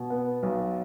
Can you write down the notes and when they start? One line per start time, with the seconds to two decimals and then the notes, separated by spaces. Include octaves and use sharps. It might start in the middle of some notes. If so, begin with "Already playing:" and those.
Already playing: B2
0.10 B3
0.43 B1